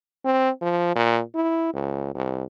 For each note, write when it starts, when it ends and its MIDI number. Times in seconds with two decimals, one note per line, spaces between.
0.25 0.50 60
0.62 0.95 53
0.96 1.21 46
1.35 1.72 64
1.74 2.11 37
2.15 2.44 36